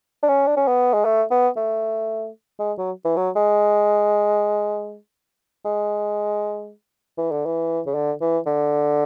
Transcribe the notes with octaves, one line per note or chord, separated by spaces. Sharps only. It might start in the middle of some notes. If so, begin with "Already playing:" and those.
D4
C#4
D4
C#4
B3
G#3
A3
B3
A3
G#3
F#3
E3
F#3
G#3
G#3
E3
D3
E3
C#3
D3
E3
D3